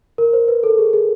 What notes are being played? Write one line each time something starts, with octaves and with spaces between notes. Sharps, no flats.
A#4
C5
B4
A4
G#4
G#4